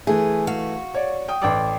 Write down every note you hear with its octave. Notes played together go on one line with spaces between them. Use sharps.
E3 A3 G#4
F#4 F5
C#5 D5
G5 D#6
A1 A4 D5 G5 D6